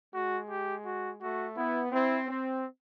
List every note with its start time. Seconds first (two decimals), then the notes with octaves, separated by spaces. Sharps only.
0.14 G#3 F#4
0.50 G4
0.85 F#4
1.21 A3 F#4
1.57 B3 E4
1.92 C4 E4
2.28 C4